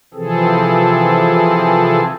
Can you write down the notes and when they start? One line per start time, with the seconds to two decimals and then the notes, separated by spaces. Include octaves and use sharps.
0.14 C3 E3 F3 C4 G#4 A4